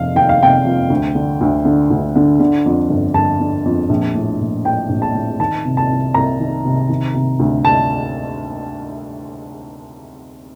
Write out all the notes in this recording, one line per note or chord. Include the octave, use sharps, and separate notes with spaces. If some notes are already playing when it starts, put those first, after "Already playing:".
Already playing: F1 F2 C3 F5
D#3 G5
F5
C3 G5
F2
D2
D3
D2
D3
D2
D3
D3
F2
G1
G1 A5
D3
F2
A#1
A2
A#1
A2 G5
A#1
A5
A2
D#3 A5
C3
A5
C2
C2 A#5
D#3
C3
D#3
C3
D2
A5